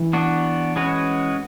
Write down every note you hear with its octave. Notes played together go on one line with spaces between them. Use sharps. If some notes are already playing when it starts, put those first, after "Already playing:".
Already playing: E3
B3 D4 F#4
G#3 C#4 F#4 B4